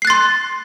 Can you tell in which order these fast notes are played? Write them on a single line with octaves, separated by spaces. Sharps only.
C7 F#6 A6 C6